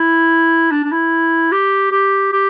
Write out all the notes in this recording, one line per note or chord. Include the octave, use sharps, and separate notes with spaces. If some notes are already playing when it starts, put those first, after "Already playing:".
Already playing: E4
D4
D4
E4
G4
G4
G4